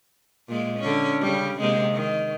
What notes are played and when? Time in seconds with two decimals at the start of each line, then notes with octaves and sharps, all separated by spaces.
0.49 A#2 G#3 A#3
0.79 D3 C#4
1.21 C#3 G3
1.60 C3 G#3 A#3
1.94 D#3